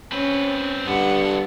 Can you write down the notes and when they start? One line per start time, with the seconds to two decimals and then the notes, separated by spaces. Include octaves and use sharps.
0.12 C4 C#4 B4
0.87 G2 D3 B3 F#5